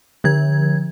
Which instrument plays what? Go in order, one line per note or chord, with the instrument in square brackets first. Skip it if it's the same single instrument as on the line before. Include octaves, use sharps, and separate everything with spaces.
[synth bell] D3 F3 G#6